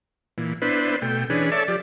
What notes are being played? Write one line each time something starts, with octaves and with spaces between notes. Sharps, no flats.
A#2 E3
B3 D4 E4 B4 C5
B2 A3 G5
E3 C#4 D4 G#4 B4
A4 C#5 D5 E5 A5
F3 G4 D5